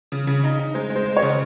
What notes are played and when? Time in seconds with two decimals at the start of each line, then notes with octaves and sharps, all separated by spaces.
0.12 C#3
0.27 C#3
0.44 D#4
0.59 D#4
0.74 G#3 C5
0.90 G#3
0.96 C5
1.06 G#3
1.17 C#5
1.22 C#3